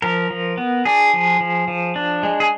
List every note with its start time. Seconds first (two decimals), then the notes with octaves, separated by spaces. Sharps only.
0.02 F3 A#4
0.30 F3
0.57 B3
0.85 D4 G#4
1.14 F3
1.40 F3
1.68 F3
1.96 D4
2.23 G#3
2.40 G#4